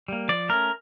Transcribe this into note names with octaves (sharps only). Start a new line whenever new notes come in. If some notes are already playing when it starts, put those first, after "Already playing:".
G3 A#3
F3 D5
A3 C#4 A#4